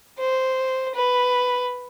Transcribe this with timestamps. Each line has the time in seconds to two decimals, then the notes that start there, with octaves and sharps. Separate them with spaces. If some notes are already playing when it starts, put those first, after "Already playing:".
0.19 C5
0.95 B4